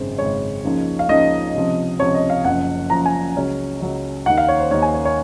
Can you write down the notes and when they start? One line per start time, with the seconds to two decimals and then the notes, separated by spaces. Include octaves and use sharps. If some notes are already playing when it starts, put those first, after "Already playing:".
Already playing: G#1 F#2 C#3 G#3 C5
0.18 G#1 F#2 C#3 G#3 C#5
0.64 C#2 C#3 F3 A#3 D#4
0.99 F5
1.09 C#2 C#3 F3 A#3 D#4 D#5
1.54 C#2 C3 F3
1.99 C#2 C3 F3 C#5
2.14 D#5
2.30 F5
2.44 F#1 F#2 F3 F#5
2.90 F#1 F#2 F3 A#5
3.06 G#5
3.35 C#2 C#3 F#3 C#4
3.80 C#2 C#3 F#3 C#4
4.26 D#2 D#3 A#3 D#4 F#5
4.38 F5
4.48 C#5
4.60 C5
4.71 D#2 D#3 A#3 D#4 C#5
4.82 G#5
4.94 C#5
5.05 C#5